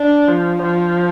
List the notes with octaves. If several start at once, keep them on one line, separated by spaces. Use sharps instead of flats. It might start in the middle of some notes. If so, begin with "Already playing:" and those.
Already playing: D4
F3
F3